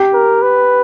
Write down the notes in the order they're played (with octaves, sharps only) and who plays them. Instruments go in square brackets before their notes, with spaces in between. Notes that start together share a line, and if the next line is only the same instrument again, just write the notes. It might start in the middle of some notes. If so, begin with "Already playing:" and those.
Already playing: [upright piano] G4 G5
[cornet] A#4
B4